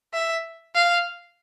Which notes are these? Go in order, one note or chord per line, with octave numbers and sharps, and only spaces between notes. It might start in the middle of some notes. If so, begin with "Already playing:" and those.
E5
F5